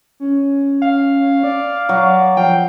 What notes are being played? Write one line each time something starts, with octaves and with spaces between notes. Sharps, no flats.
C#4
F5
D5
F#3
F3 F5 G5